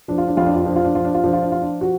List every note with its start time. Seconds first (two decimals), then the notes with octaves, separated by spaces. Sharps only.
0.08 F3 D4
0.18 F4
0.28 D4
0.37 F2 F4
0.46 D4
0.56 F4
0.65 F3 D4
0.76 F4
0.85 D4
0.95 F3 F4
1.05 D4
1.14 F4
1.24 F3 D4
1.33 F4
1.42 D4
1.52 F3 F4
1.62 D4
1.81 F3 F#4